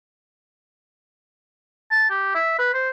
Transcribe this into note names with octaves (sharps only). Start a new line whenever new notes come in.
A5
G4
E5
B4
C5